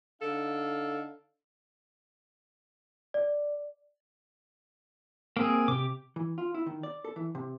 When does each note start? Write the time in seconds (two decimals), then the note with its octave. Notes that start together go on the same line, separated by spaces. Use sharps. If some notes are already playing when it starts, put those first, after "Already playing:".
0.21 D3 D#4 A4 F5
3.14 D5
5.37 A#3 C4 G#4
5.68 C3 G4 D6
6.16 E3
6.38 F4
6.55 E4
6.66 D#3
6.83 D5
7.05 A4
7.16 E3
7.35 C3